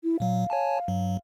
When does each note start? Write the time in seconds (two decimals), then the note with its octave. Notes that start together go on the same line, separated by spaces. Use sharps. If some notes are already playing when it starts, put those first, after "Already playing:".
0.04 E4
0.20 A#2 F#3 F5
0.50 C#5 G#5 A5
0.88 G2 F#3